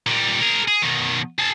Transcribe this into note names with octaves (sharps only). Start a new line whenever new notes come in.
A#2 G3
G#4 A#4
G#4
B2 D#3
G#4 A5